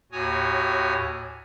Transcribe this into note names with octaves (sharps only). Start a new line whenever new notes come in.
D#2 A2 F#4 C#5 G#5 D#6